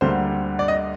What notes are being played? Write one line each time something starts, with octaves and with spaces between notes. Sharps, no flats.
D2 D3 G3 A#3 C5
D5
D#5